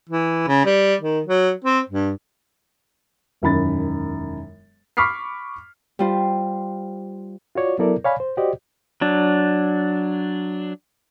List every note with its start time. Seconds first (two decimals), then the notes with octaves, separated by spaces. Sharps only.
0.09 E3
0.48 C#3
0.65 G3
1.02 D#3
1.27 F#3
1.64 C4
1.89 G2
3.42 E1 F#2 D#3 B5 A6
4.97 B5 C#6 D6 F6 B6 C7
5.99 G3 F4 C5
7.55 F4 F#4 C#5 D5
7.79 F#3 B3 E4 A4 A#4 D5
8.04 C#5 D5 F5 G#5 B5
8.20 C5
8.37 F#4 G4 C5 D5 D#5
9.01 F#3 D4